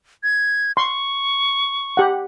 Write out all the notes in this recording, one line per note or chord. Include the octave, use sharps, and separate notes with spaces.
G#6
C6 C#6
G4 F#5